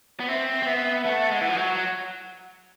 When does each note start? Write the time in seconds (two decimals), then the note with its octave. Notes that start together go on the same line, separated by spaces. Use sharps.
0.20 B3
0.28 C4 E5
0.63 C4
0.66 B3
1.05 A3 F#5
1.31 G#3
1.41 E3
1.49 F3
1.56 F#3